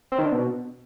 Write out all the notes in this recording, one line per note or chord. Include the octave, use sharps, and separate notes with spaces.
C4
D#3
D3
B2